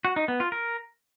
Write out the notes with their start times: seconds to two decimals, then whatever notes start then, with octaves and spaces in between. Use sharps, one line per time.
0.05 F#4
0.16 D#4
0.28 B3
0.40 F4
0.52 A#4